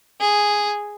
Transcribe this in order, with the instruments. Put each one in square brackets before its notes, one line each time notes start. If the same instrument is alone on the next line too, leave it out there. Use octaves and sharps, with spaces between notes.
[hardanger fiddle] G#4